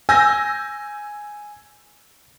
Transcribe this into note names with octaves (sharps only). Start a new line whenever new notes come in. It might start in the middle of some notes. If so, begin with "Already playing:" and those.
G#5 E6 G6 A#6